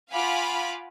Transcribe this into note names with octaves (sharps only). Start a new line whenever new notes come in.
F4 F5 F#5 G#5 B5 D6